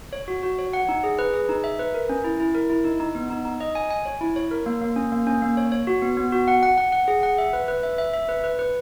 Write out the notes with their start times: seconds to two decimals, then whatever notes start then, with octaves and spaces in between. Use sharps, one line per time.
0.13 C#5
0.28 F#4
0.43 F#4
0.59 C#5
0.73 F#5
0.89 D#4
1.04 G#4
1.19 B4
1.34 G#4
1.49 D#4
1.64 E5
1.79 B4
1.94 A#4
2.09 C#4
2.24 E4
2.40 E4
2.55 A#4
2.70 E4
2.85 D#4
3.00 D#4
3.15 B3
3.30 D#4
3.45 D#4
3.60 D#5
3.75 G#5
3.91 G#5
4.05 C#5
4.21 E4
4.36 C#5
4.51 A#4
4.66 A#3
4.81 A#3
4.96 C#4
5.12 A#3
5.27 C#4
5.42 A#3
5.57 C#5
5.72 C#5
5.87 F#4
6.02 B3
6.17 B3
6.32 F#4
6.48 F#5
6.63 F#5
6.78 F#5
6.92 F#5
7.08 G#4
7.23 F#5
7.38 E5
7.53 B4
7.68 B4
7.83 E5
7.98 E5
8.13 E5
8.29 B4
8.44 B4
8.59 B4